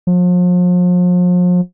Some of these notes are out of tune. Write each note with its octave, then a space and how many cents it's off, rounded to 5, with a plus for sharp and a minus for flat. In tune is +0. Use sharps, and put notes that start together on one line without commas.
F3 +40